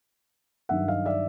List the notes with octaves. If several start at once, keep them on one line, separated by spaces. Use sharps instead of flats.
G2 D#3 F#3 E5 F#5
D#5 F5
D5 E5